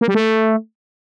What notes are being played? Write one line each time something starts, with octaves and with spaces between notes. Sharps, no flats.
A#3
G3
A3